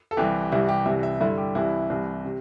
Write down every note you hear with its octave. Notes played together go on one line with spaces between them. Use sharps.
A4
C2 C3 E3 G4
C2 C3 E3 E4
G4
C2 C3 E3 E5
E5
G2 D3 E4
G4
C2 C3 E3 E4
C2 C3 E3
C3